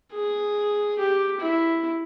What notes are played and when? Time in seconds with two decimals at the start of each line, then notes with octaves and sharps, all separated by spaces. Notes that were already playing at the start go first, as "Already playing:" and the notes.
0.13 G#4
0.99 G4
1.40 E4